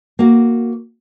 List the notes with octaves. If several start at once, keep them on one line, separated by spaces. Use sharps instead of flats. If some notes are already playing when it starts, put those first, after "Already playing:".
A#3 F#4